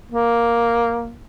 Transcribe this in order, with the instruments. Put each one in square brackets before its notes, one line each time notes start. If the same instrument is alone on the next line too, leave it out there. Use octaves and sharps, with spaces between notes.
[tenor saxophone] A#3